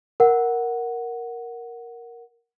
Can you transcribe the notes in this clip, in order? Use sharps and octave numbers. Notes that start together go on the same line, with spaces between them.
A#4 F#5